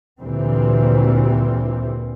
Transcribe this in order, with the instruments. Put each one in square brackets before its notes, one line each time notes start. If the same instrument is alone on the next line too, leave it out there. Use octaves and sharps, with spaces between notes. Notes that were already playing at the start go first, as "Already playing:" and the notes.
[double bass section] D2 A#2 E3 G3 C4